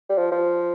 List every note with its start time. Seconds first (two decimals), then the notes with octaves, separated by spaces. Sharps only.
0.10 G3
0.18 F3
0.32 F3